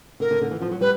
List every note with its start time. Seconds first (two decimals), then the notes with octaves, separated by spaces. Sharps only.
0.20 D3 A#4
0.31 D3
0.41 D3
0.51 E3
0.62 F3
0.71 F#3
0.81 G3 B4